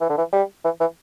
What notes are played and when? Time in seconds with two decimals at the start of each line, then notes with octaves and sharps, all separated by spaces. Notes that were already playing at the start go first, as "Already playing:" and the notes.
0.01 E3
0.09 D3
0.18 E3
0.33 G3
0.65 E3
0.81 E3